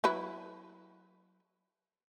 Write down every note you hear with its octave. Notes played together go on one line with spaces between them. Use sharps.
F#3 E4 B4